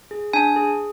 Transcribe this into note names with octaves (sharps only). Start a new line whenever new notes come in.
G#4
D4 G#5
G#4